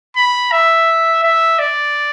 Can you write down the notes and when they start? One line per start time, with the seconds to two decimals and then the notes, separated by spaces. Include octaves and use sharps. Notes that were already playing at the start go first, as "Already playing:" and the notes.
0.17 B5
0.52 E5
1.24 E5
1.59 D5